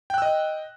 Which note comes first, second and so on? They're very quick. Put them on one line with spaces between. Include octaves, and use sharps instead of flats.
G5 F#6 E6 D#5